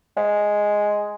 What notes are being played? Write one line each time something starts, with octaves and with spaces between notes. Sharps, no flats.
G#3